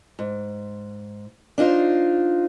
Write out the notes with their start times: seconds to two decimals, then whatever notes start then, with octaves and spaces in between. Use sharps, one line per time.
0.19 G#2
1.58 D4 D#4 F4 C5